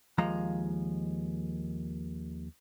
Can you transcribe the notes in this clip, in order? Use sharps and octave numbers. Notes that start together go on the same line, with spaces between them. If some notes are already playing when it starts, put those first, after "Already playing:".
D#2 F3 G#3 A#5